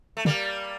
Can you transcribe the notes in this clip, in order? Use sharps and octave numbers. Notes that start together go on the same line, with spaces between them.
A3
D3 G3 A#3